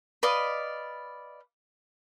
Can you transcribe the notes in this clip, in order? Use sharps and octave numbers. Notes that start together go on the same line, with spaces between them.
B4 D5 D#5 F5